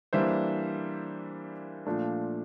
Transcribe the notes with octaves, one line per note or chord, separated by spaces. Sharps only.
E3 G3 A#3 D4 C5 E5
A#2 F3 A3 D4